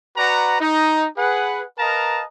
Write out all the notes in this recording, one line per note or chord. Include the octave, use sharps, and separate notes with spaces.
F#4 B4 D5 F#5 A#5
D#4
G#4 B4 F#5
A#4 B4 D#5 F5 A5 A#5